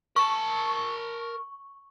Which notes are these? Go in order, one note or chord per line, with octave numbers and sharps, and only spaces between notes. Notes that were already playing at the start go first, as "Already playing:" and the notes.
A#4 A5 C#6